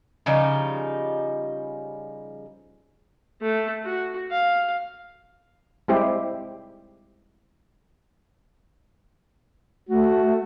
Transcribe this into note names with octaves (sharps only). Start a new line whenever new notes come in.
C#3 F3 G3 D#4
A3
F#4
F5
G3 G#3 C4 E4 G4 C5
A3 F#4